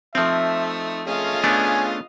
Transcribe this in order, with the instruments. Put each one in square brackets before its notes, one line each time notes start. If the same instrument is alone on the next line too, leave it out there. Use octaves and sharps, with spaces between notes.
[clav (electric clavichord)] F3 C4 [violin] A3 D#4 [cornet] E5
[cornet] A3 [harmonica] C#4 F4 G#4 [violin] D#5 F5
[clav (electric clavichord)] A3 B3 D4 [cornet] G#5